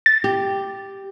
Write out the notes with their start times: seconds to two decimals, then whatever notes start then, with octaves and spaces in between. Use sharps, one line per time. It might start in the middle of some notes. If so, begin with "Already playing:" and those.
0.06 A6
0.24 G4